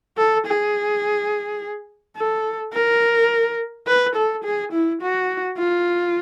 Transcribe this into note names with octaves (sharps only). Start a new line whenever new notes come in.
A4
G#4
A4
A#4
B4
A4
G#4
E4
F#4
F4